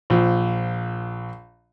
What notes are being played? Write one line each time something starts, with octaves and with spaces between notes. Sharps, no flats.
A#1 F3